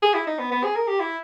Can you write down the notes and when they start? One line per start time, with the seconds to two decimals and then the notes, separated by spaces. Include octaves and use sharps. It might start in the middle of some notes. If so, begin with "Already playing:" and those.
0.03 G#4
0.14 E4
0.27 D#4
0.39 B3
0.52 B3
0.64 G#4
0.76 A#4
0.88 G4
1.00 E4